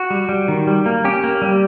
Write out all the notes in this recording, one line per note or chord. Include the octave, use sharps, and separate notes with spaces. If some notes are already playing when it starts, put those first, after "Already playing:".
Already playing: F#4
G3
G3
D#3
G3
A#3
C#4 G4
A#3
G3